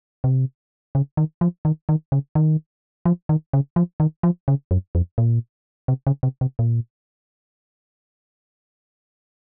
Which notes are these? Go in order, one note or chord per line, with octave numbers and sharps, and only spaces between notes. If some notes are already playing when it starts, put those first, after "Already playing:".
C3
C#3
D#3
F3
D#3
D#3
C#3
D#3
F3
D#3
C#3
F3
D#3
F3
C#3
F#2
F2
A#2
C3
C#3
C3
C3
A#2